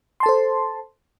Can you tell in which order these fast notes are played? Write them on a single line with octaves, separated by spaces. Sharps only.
C6 A5 A4 C5